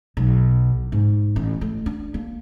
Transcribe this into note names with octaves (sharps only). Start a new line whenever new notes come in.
B1
G#2
A1
A3
D4
A#3